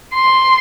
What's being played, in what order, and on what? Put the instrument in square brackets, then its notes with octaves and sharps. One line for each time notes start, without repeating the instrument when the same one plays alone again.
[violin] C6